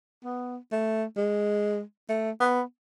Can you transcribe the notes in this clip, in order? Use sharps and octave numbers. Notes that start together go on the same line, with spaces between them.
B3
A3
G#3
A3
B3